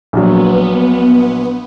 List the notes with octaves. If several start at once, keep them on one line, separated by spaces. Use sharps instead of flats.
A#1 A#2 F#3 B3